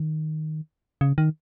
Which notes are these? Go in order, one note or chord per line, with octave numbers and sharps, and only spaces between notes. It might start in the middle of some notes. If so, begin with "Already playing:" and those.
Already playing: D#3
C#3
D#3